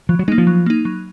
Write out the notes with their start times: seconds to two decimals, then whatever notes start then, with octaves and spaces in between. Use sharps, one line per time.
0.09 F3 F#3
0.19 F#3
0.28 G#3 A#3 D#4
0.38 F3
0.47 F#3
0.66 A#3 D#4
0.85 F#3